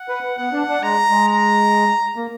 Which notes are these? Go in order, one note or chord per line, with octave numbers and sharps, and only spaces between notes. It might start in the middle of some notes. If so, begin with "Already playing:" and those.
Already playing: F#5
B4
B3 F#5
D4
D4
G#3 A#5
G#3
A#5
A#3